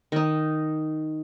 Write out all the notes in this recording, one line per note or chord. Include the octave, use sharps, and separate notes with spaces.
D#3 D#4